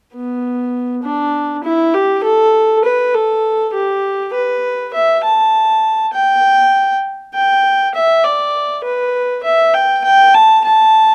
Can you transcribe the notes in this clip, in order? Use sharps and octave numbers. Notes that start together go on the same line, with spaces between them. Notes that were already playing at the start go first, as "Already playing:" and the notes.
B3
D4
E4
G4
A4
B4
A4
G4
B4
E5
A5
G5
G5
E5
D5
B4
E5
G5
G5
A5
A5